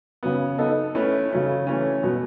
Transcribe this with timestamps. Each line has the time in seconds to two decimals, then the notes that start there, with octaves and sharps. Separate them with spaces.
0.23 C#3 F#3 B3
0.58 B3 D#4 A4 D#5
0.95 A3 C#4 E4 B4
1.30 C#3 F#3 A3 C#4
1.67 E3 A3 C#4
2.03 B2 F#3 B3